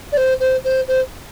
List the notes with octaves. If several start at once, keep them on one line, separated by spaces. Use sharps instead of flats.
D5
C5
C5
C5
C5